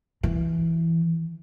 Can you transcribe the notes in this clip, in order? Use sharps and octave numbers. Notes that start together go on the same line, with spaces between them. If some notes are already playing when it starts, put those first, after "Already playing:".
E3